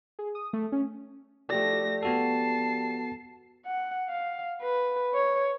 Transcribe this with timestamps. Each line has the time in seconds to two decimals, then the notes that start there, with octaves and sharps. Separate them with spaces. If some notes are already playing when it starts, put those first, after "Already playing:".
0.19 G#4
0.35 D#6
0.53 A3
0.72 C#4
1.50 F3 A3 G4 D5 A#6
2.03 B3 F#4 A4 A5 C7
3.66 F#5
4.09 F5
4.62 B4
5.14 C#5